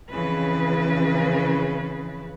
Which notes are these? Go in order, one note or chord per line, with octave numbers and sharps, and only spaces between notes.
F2 C#3 E3 B4